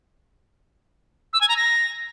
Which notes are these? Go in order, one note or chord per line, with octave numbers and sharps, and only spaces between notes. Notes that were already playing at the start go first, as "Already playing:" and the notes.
E6
G#5
A#5
A#6